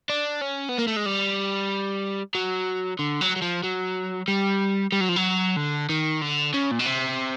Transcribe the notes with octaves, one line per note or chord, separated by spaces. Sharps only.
D4
C#4
B3
A#3
A3
G#3
G3
F#3
D3
F#3
F#3
F3
F#3
G3
G3
F#3
F3
F#3
D3
D#3
D3
C#3
A#2
B2
C3